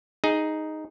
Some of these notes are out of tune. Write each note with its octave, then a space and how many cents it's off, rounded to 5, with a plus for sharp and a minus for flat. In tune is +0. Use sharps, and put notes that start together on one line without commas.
D#4 +0 G#4 +0